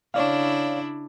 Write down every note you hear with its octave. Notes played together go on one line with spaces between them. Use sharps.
C#3 D4 E4 C#5 D5 F5